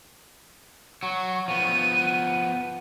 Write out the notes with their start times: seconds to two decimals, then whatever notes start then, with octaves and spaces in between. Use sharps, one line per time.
1.03 F#3 C#6
1.48 F3 B3 D#7